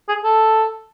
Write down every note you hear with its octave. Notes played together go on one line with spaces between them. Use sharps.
G#4
A4